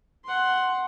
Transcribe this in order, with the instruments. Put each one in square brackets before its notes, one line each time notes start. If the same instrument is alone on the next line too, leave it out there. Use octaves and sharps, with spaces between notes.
[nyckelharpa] F#5 C6